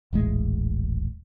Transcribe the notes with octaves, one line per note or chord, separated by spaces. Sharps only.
D#1 A1 G#3